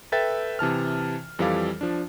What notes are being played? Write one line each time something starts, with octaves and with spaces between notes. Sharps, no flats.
A4 B4 E5 G5 A6
C3 E3 A5 F6
F2 E3 G3 A4 F5 D6
F3 D4